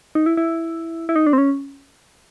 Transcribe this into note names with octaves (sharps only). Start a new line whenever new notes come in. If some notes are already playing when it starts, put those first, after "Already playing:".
D#4
E4
E4
E4
D#4
D4
C4
C#4